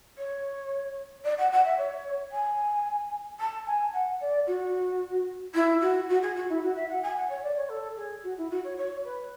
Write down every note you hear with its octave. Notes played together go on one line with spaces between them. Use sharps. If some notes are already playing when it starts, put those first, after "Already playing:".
C#5
D5
F#5
F#5
E5
C#5
G#5
A5
G#5
F#5
D5
F#4
E4
F#4
F#4
G#4
F#4
E4
F#4
E5
F#5
G#5
F#5
C#5
D5
C#5
A4
G#4
F#4
E4
F#4
C#5
C#5
B4